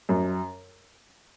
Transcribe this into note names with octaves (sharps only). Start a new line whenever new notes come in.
F#2